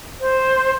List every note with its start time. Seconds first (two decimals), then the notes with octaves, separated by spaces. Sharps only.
0.20 C5